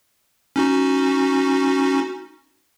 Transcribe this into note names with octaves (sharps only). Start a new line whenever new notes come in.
C#4 D#4 F#4